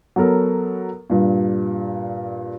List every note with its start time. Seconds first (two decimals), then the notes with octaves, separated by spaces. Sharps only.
0.16 F#3 B3 A4 A#4
1.10 G2 A#2